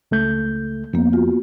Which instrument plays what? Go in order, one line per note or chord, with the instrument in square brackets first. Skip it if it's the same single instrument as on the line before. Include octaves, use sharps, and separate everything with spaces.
[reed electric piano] C#2 A3 G6
[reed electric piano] F2 [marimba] A#3 B3
[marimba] F4 F#4